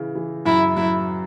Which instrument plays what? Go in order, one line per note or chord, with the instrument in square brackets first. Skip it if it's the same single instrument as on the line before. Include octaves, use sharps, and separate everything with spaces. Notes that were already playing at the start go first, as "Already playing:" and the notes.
Already playing: [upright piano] C#3 E3
E3
[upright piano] F#2 [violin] E4
[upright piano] F#3 [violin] E4